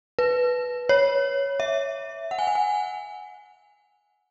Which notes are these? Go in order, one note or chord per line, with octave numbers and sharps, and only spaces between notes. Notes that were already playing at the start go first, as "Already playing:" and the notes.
B4
C#5
E5
F#5
G#5
F#5
G#5